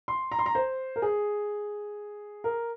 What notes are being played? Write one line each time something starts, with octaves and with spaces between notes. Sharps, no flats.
C6
A#5
C6
A#5
C5
A#4
G#4
A#4